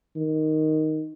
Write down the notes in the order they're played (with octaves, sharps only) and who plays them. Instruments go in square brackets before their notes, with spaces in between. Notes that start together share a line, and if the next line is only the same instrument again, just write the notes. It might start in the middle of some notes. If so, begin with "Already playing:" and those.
[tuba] D#3